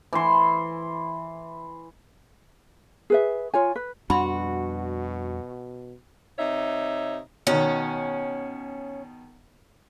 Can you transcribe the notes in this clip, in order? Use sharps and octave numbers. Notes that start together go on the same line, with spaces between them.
E3 C6
G#4 B4 E5
F4 C#5 G#5
B4
F2 B2 G3 D4 F#4 B5 C6
C3 D#4 C#5 E5
B2 D#3 C#4